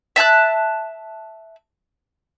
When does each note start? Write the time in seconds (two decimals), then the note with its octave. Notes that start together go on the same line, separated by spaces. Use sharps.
0.16 E5 A5 E6 F#6